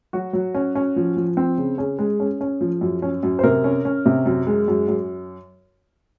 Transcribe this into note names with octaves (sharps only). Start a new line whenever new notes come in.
F#3 F#4
F#3
C#4
C#4
F3
F3
C4
C#3
C#4 G#4
G#3
C#4
C#4
F3
F#2
C#4
F#2
C5
C3 A#4
C#4
C#4
C3
F#2
G#3
F#2
F#2